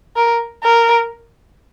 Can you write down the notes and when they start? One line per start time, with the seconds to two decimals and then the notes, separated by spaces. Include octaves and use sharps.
0.16 A#4
0.64 A#4